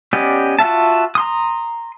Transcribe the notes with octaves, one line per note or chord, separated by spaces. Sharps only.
B3 C#4 G4 D5 D#5
F4 F#4 E5 A5
A#5 C6 D#6